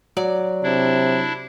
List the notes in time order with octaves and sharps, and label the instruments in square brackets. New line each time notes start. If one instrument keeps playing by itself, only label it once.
[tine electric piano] F#3 [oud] D5
[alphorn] C3 [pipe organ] D4 E4